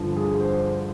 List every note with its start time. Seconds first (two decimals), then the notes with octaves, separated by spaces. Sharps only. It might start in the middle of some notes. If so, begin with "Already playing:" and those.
Already playing: G2 D3 F3
0.16 G#4
0.40 C5